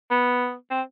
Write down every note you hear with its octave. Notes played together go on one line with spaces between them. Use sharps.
B3
C4